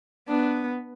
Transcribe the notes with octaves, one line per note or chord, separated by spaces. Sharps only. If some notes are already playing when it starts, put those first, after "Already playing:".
B3 D4